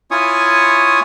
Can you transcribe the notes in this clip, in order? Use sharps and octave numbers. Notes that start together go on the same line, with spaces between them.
E4 F4 C#5 G#5 C#6 D#6